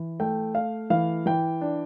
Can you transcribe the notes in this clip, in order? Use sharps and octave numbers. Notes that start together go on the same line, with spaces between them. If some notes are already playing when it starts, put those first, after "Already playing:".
Already playing: E3
A3 G5
A3 F5
E3 F5
E3 G5
D4